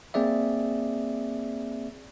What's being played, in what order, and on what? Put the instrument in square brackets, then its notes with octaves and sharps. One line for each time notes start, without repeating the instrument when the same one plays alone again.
[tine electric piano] A#3 C4 G#4 D5 E5